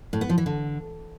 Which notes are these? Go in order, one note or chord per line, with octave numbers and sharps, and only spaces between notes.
A2
B3
F3
E3
D3